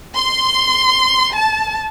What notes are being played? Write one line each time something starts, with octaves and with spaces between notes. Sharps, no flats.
C6
A5